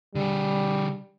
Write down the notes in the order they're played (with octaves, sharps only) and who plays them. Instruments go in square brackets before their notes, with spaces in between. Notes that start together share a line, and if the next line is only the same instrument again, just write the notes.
[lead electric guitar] D3 G#4 [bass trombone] G3